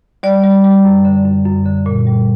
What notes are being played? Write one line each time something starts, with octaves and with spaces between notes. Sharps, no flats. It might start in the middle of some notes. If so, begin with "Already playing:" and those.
G3 D5
G3
G3
F#2
D3
F#2
F#2
D3
A#2
G3